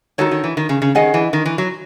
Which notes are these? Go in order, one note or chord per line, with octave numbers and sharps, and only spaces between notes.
D#3 D#4 F#4 A4 C#5
D#3
E3
D#3
C#3
C#3
D#3 C#4 G#4 D#5 F#5
E3
D#3
E3
F#3